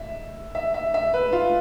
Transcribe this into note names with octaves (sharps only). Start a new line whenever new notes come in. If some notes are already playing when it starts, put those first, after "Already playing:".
Already playing: E5
E5
E5
E5
B4
F4